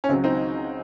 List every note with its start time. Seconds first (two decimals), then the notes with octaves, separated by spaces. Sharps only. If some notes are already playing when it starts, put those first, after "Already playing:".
0.04 C#4
0.09 C#2 C#3 F#3 C4
0.24 C4 D#4